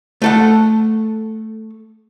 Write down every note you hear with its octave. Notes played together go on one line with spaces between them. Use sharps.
A3 A4 F#5